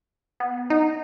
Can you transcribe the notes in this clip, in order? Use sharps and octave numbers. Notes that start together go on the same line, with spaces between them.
B3
D#4